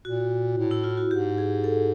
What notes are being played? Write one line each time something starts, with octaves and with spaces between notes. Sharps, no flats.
A#2 F#4
A2
E4
F4
F#4
G#2 G4
G#4
A4